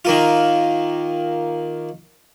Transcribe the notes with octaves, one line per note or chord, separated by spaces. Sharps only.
D#3 A#3 F4